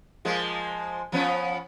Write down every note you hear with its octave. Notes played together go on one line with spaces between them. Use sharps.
F3 G#3 A#3
F3 B3 C#4